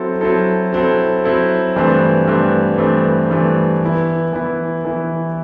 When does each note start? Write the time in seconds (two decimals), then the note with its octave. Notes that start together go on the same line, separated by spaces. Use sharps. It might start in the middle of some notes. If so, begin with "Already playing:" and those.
Already playing: F#3 C4 E4 A4
0.21 F#3 C4 E4 A4
0.73 F#3 C4 E4 A4
1.24 F#3 C4 E4 A4
1.76 G2 E3 A3 C4
2.27 G2 E3 A3 C4
2.78 G2 E3 A3 C4
3.30 G2 E3 A3 C4
3.82 E3 B3 E4
4.33 E3 B3 E4
4.85 E3 B3 E4